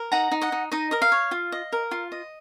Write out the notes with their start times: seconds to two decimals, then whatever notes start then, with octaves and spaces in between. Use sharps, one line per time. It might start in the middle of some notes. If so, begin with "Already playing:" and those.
Already playing: A#4
0.12 D#4 F#5 A#5
0.31 D#4
0.41 D#5 F#5
0.52 D#4
0.72 D#4 D#5
0.91 A#4 D#5
1.02 F5
1.12 C#5
1.31 F4
1.52 D#5
1.72 A#4
1.91 F4
2.12 D#5